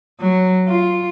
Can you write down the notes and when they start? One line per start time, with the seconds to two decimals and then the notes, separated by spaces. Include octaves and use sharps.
0.20 F#3
0.68 F4